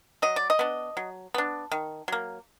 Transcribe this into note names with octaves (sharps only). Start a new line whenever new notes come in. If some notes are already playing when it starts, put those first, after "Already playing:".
F#3 D#5
D5
D#5
B3 D4
F#3
B3 D4
D#3
F#3 A#3